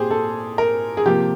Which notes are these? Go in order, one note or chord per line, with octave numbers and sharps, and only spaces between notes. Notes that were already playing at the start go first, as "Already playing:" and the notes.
Already playing: A#2 G4 G#4 C5
A4
A#4
G#4
C3 F3 A#3 G4